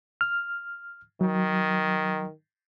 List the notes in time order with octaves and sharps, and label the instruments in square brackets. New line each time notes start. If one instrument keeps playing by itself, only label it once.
[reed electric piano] F6
[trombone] D#3 [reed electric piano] F#3